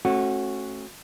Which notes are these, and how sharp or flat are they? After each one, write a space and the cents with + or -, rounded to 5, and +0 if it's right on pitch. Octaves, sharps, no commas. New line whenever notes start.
A3 -10 C#4 -35 F#4 +0